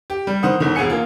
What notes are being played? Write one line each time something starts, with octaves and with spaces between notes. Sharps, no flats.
G4
G3
D#3 C5 F#5 D#6
G1 D#3
E1 G#4 F#5 G#5 C#7
A#3 F4